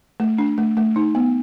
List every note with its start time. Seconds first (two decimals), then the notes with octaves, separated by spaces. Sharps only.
0.20 A3
0.38 D4
0.58 A3
0.77 A3
0.96 D#4
1.15 B3